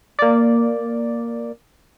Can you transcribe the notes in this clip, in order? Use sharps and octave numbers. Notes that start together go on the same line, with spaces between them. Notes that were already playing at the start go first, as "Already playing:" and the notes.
A#3 D5